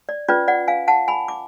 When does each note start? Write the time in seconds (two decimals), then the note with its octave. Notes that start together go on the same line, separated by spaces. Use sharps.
0.09 D5
0.28 C#4 F4 B4 D5
0.48 D5 F#5
0.68 F5 G#5
0.88 F#5 A5
1.08 G#5 B5
1.28 D6